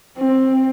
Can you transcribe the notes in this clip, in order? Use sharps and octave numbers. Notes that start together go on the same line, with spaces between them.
C4